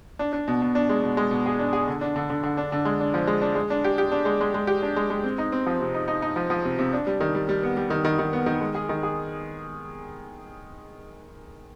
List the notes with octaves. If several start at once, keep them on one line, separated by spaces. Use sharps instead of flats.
D4
D4
B2
B2
D4
G#3
B2
G#3
B2
G#4
D4
G#4
D3
D4
D3
D3
D3
D4
D3
G#3
D4
F3
G#3
D4
G#3
D4
G4
G4
D4
G#3
G#3
G#3
G4
D4
G#3
G#3
C4
D#4
C4
F3
C3
D#4
D#4
D#4
F3
F3
C3
C3
D4
G3
D#3
G3
G3
B3
G3
D#3
D#3
D#3
B3
D#3
G#3
G#4
D#3
G#4